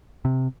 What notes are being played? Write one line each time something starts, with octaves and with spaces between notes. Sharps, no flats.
C3